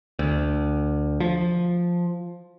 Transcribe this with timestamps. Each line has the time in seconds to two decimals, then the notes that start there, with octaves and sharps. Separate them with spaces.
0.19 D2
1.20 F3